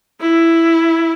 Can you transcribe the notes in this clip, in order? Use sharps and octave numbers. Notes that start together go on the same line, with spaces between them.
E4